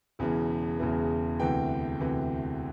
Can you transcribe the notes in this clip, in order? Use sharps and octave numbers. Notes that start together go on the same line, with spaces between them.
E1 E2 C#3 E3
E1 E2 C#3 E3
D2 C3 E3 G5
D2 C3 E3